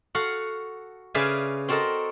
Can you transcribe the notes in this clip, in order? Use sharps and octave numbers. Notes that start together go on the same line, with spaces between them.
F#4 A4 F5 F#5
C#3 B4 D5 E5 F5 G#5
C4 F#4 A4 A#4 D#5 A5